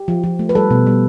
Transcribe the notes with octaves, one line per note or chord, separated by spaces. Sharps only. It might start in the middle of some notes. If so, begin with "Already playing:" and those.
Already playing: G4
F3
F3
A3
B4
G3 A4
B2
G3